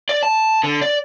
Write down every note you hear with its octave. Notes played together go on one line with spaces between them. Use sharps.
D5
A5
D3
D5